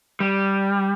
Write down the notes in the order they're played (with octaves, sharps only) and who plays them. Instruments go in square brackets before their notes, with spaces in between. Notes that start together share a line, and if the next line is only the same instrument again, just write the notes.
[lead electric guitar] G3